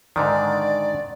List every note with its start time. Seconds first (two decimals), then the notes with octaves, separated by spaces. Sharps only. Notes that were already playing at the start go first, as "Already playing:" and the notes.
0.16 G#2 D3 D#3 D5